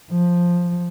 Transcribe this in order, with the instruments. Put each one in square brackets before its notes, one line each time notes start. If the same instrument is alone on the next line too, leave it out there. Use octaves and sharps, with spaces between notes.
[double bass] F3